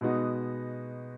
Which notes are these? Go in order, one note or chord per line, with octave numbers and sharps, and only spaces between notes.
B2 G#3 B3 D#4 F#4